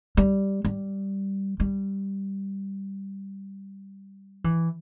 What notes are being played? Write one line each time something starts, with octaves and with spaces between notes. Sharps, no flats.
G3
G3
G3
E3